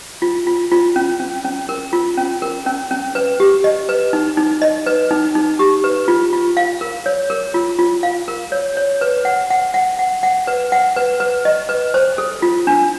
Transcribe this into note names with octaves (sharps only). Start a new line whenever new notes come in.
F4
F4
F4
C#4
C#4
C#4
A#4
F4
C#4
A#4
C#4
C#4
B4
G4
D#5
B4
D#4
D#4
D#5
B4
D#4
D#4
G4
B4
F4
F4
F5
A#4
C#5
A#4
F4
F4
F5
A#4
C#5
C#5
B4
F#5
F#5
F#5
F#5
F#5
B4
F#5
B4
B4
D#5
B4
C5
A4
F4
D4